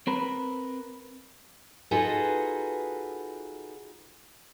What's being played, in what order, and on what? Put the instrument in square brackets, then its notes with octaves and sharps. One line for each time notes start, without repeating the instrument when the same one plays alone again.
[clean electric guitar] C4 A#4 B4
[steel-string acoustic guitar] D#4 F4 F#4 G#4 A4 B4